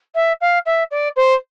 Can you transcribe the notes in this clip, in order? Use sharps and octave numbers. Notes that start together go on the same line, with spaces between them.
E5
F5
E5
D5
C5